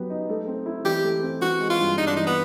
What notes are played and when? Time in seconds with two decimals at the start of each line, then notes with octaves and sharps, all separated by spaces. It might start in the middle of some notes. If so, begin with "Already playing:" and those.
Already playing: F#3 B3 G4
0.10 D#4
0.29 A3
0.47 C4
0.66 E4
0.84 E3 G4
1.03 A3
1.23 C4
1.41 E3 F#4
1.60 G#3
1.70 F4
1.80 G2
1.98 G2 D#4
2.07 D4
2.16 E3 D#4
2.26 B3